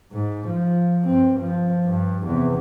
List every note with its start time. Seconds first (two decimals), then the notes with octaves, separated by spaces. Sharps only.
0.12 G#2
0.48 F3
1.05 G2 C4
1.41 F3
1.85 G2
2.27 E2 C3